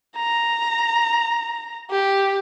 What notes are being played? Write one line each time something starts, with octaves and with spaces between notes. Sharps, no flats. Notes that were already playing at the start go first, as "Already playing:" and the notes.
A#5
G4